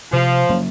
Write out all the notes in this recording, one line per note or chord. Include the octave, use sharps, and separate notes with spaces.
C3 F3
F#3 A#3 C#4